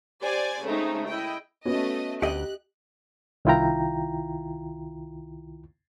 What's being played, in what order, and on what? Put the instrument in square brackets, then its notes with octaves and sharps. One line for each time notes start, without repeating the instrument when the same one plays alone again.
[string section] G4 C5 D5 G#5
C#3 G#3 A3 C4 D#4
E4 D#5 G5
[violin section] A3 D#5 [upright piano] B3 C#4 F#4
[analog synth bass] D2 [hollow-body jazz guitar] G4 D#5 [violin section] F#6
[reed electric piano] C2 D#3 E4 F4 G5 A#5